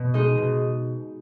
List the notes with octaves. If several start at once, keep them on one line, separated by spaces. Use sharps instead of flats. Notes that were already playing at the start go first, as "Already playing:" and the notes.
Already playing: B2
G#3 D#4 G#4 D#5
B2